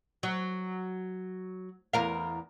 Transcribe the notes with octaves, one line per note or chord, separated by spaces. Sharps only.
F#3
E2 A#4 F5